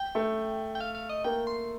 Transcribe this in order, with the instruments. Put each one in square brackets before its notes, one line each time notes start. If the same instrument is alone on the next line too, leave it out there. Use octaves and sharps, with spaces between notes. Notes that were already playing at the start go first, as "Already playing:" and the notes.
Already playing: [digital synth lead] G5
[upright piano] A3
[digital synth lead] G5
F5
F5
D#5
[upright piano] A#3 [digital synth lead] G5
[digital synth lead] C6